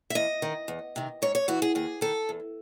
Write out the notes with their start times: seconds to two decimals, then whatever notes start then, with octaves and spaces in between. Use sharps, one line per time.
0.10 E5
0.15 E2 D#5
0.42 D#3
0.68 E2
0.96 C3 D#3
1.22 G#2 C#5
1.35 C#5
1.48 E3 F#4
1.62 G#4
1.75 D#2 G#4
2.01 D#3 A4
2.29 E2